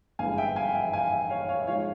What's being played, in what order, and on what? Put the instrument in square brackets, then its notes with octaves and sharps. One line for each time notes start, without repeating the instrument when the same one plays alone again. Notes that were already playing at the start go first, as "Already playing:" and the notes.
[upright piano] G1 G2 E3 G#3 C#4 F5 G#5
E5 G5
F5 G#5
E5 G5
F5 G#5
E5 G5
C#5 F5
C#5 F5
E5
G#2 F3 G#3 C#5 F5